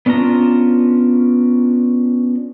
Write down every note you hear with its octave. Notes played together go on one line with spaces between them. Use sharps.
B3 C#4 D4 F4 A#5